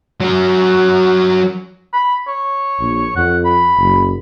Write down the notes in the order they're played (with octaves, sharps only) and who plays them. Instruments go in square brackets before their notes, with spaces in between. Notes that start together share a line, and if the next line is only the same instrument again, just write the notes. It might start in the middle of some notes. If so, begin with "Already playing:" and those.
[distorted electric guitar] F#3 A#4
[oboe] B5
C#5
[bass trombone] A#1
[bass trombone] F2 [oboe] F#5
[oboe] B5
[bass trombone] F#1